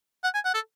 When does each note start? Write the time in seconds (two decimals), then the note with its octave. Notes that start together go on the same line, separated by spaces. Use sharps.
0.24 F#5
0.34 G#5
0.45 F#5
0.54 A4